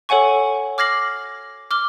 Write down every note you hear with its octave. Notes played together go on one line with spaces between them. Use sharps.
A4 C#5 F#5 G#5 C#6
D6 F6 G#6 A#6 C7 F#7
D6 F6 G7